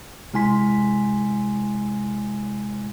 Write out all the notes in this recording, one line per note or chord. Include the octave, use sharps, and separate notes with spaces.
C3 G#3 E4 G#5 C6 B6